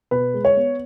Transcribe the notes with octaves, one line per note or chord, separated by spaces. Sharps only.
B2 B4
G#3
C#5
B3